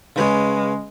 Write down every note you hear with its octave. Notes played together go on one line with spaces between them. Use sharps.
C#3 G#3 B4 C#5